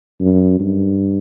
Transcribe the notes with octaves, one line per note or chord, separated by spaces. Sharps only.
F#2
G2